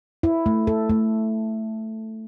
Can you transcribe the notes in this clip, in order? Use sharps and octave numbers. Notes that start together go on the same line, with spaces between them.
E4
A3
A4
A3